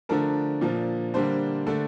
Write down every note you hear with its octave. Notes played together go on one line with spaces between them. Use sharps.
D3 F3 A3 D4 A#4
A#2 F3 A#3 D4
D3 G3 A#3 D4 C5
D3 A3 D4